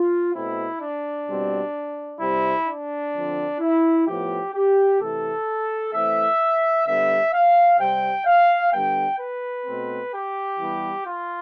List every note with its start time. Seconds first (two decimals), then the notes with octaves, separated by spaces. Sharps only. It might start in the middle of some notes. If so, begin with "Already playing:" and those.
Already playing: F4
0.34 B2 A3 C4 E4
0.81 D4
1.27 B2 G3 C4
2.21 C3 G3 C4 E4
2.67 D4
3.14 D3 F3 C4
3.60 E4
4.07 A2 F3 B3 G4
4.54 G4
5.00 C3 E3 A3 A4
5.93 E3 A3 C4 E5
6.87 D3 G3 B3 E5
7.33 F5
7.80 C3 G3 C4 G5
8.26 F5
8.73 D3 G3 B3 G5
9.20 B4
9.67 B2 A3 C4
10.13 G4
10.59 E3 G3 B3
11.07 F4